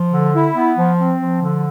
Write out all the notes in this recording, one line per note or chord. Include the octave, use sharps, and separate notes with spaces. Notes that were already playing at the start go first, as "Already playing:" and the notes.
Already playing: F3
D3
E4
B3
F3
C4
F3
D3